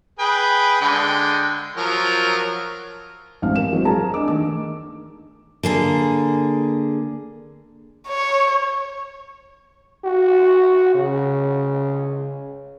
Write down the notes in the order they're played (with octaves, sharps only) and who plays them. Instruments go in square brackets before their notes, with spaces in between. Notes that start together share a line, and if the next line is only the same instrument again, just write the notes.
[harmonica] G#4 B4 G5
D3 G#3 G5
F3 F#3 A#4
[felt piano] A1 G#2 C4 F5 F6
A#4 E7
E3 F#3 G#3 C4
G#4 A#4 A5 A#5
D4 D#5 D6
D#3 A3 A4 D6
[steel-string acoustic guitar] D3 A#3 G#4
[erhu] C#5
[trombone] F#4
C#3